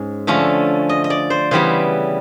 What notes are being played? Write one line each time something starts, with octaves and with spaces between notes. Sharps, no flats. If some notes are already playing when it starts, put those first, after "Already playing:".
Already playing: G#2 G#3 C#4
D3 F3 A3 C#4
D#5
D#5
D5
C5
C#3 E3 G3 B3 C5